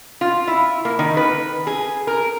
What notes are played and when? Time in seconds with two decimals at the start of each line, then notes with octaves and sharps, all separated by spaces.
0.21 F4
0.48 E4
0.85 A#3
0.99 D#3
1.17 B4
1.67 G#4
2.07 A#4